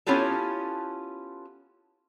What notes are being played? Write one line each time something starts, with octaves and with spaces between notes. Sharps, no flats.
B3 C#4 E4 F4 G4 A4